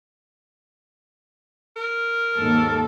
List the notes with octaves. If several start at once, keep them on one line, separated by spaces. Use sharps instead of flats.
A#4
D#2 G#2 A4